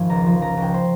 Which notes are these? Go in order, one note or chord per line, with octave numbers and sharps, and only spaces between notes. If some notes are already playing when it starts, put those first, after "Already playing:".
Already playing: G#1 F3 G#5
C#2 A#5
F3
C#3 A#5
C#2 G5
C5